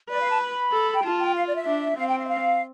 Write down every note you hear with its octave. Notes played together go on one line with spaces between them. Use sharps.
B4 D5
F5
A5
B5
A4
G5
F4 A5
G5
F5
D5
E5
D4
C4 F5
G5
F5
E5
F5